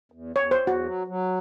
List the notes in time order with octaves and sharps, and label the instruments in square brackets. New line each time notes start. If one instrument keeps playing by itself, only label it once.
[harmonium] E2
[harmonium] E2 [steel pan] C#5
[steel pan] C5
[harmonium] E2
[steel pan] F#4
[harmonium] F#3
F#3